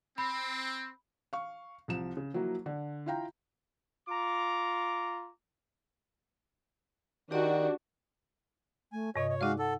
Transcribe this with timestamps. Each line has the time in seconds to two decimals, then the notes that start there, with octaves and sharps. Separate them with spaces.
0.18 C4 B5
1.33 F5 C#6
1.88 C2 F3 E7
2.17 C#3
2.34 F3 F#3 A#3 E4 F#4
2.66 D3
3.06 E4 F4 F5 G5 A#5
4.08 F4 A#5 D6
7.31 D#3 D4 F#4 G4 D5
8.92 A3 G#5
9.16 G2 C3 C#5 D#5
9.29 C#5
9.41 G#3 D#4 F#4 D5 F5
9.59 A4 F#5